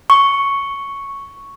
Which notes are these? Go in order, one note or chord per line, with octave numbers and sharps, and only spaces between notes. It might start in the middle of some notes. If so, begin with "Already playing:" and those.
C#6